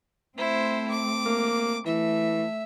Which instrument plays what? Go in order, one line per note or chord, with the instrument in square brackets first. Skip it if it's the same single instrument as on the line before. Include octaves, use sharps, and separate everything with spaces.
[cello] A3 C4 [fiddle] E4 C5
[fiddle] D6
[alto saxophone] A#3
[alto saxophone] E3 [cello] A3 [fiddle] E5